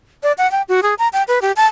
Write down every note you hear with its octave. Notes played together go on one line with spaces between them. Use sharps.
D5
F#5
G5
F#4
G#4
A#5
G5
B4
G4
A5